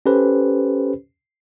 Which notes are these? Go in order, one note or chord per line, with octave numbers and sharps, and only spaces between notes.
C#4 G4 A4 B4 C5